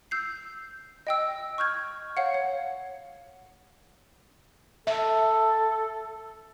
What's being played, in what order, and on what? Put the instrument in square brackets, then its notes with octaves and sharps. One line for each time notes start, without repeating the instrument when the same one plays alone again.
[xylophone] E6 G6 C7
D#5 G5 E6
C#6 F6 G6 G#6
C#5 F5 F#5
C#5
[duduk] A4 [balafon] E5